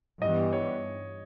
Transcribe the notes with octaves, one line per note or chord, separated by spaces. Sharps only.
G2 E3 G3 B3 D#5
C#5